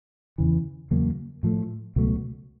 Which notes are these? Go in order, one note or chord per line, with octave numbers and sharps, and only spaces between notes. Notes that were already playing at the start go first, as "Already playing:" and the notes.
E2 C#3 E3
E2 C#3 F#3 A#3
A2 F3 A3
C#2 B2 F#3 A3